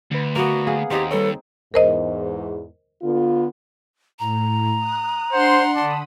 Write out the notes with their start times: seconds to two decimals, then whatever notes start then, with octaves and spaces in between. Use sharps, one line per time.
0.11 D2 D3 B4
0.36 A#3 B3 F#4
0.67 G#4 F5 F#5 D#6
0.91 D#2 C4 D#4 G4
1.11 G3 A4 B4 C#5
1.74 E2 G#2 A#4 C5 D#5
3.02 D3 B3 F4
4.19 A2 A#5
4.76 D#6 F#6
5.33 D4 C5 F#5 C6
5.75 D3 D5 A5 B5 D#6